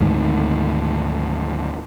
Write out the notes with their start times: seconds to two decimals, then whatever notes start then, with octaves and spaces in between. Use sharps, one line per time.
0.01 D2 G#2 D#3